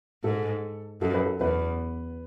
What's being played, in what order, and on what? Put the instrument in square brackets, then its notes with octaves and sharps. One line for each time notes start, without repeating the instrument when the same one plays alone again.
[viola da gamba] G#2 [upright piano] A4
[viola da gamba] F#2 [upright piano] A4
[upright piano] B4
A4
[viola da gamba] E2 [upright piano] B3 B4